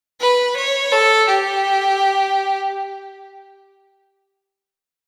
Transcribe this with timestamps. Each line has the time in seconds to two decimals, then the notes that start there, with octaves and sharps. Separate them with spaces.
0.20 B4
0.56 C#5
0.92 A4
1.28 G4